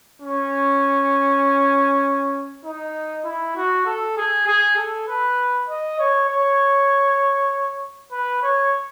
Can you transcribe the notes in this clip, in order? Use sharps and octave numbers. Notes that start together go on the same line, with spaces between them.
C#4
D#4
E4
F#4
A4
G#4
G#4
A4
B4
D#5
C#5
C#5
B4
C#5